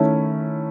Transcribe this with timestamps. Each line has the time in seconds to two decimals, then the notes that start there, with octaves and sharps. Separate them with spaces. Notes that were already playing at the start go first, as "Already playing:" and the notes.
Already playing: D#3 A3 C#4 E4